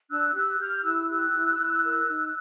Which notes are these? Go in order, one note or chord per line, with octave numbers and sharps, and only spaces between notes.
D4 E6 F#6
G4 E6 F#6
G4 F6 G6
E4 E6 F#6
G4 E6 F#6
E4
E4
A#4
D#4